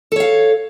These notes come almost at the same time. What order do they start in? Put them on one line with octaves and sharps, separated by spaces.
A4 C#5 F5